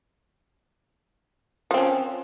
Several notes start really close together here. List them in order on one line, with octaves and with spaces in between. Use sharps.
F3 C4 C#4